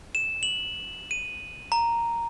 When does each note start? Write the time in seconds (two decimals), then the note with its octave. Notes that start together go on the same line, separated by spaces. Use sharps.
0.15 E7
0.43 F#7
1.11 D#7
1.72 A#5